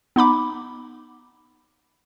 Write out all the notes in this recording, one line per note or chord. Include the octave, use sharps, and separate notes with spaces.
B3 D#4 B5 D6